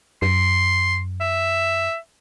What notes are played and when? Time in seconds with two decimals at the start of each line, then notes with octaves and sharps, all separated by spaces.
0.22 F#2 C6
1.20 E5